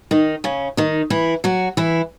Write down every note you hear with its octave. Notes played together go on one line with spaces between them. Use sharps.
D#3 D#4
C#3 C#4
D#3 D#4
E3 E4
F#3 F#4
E3 E4